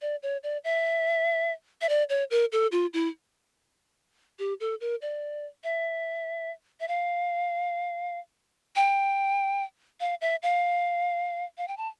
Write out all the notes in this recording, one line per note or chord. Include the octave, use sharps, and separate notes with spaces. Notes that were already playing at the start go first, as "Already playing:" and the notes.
D5
C#5
D5
E5
E5
D5
C#5
A#4
A4
F4
E4
G4
A4
A#4
D5
E5
E5
F5
G5
F5
E5
F5
F5
G5
A5